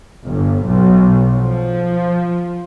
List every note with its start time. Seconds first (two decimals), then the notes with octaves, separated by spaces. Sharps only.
0.24 G1
0.64 B1
1.35 F3